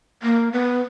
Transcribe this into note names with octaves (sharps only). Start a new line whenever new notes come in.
A#3
B3